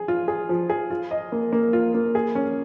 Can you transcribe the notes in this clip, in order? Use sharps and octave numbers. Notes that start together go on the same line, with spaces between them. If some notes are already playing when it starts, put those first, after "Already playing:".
Already playing: G#4
F4
G#4
F3
G#4
F4
D#5
A#3
A#3
F4
A#3
G#4
C#4